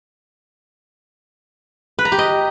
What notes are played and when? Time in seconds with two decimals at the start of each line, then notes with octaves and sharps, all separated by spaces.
1.99 B4
2.05 A#5
2.12 G4
2.19 D#5